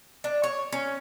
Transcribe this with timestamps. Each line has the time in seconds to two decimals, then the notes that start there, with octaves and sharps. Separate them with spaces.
0.24 D4
0.44 C#5
0.72 C#4